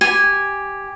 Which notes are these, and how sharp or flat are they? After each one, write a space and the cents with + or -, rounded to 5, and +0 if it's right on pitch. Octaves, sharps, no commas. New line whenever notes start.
G4 +0 G#5 -10